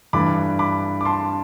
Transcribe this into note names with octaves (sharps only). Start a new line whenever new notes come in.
G2 E3 A3 D4 B5 D6
B5 D6
D6
A5 C6